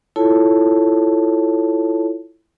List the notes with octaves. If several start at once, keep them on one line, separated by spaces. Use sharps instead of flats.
E4 F4 A4 C#5 A5